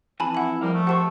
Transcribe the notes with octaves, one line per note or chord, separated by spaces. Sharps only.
F2 E3 G#5 A5 B5
E4 F#5 B5
F3 G3 A#4 F5
A3
G4 C5 F#5 A5 C#6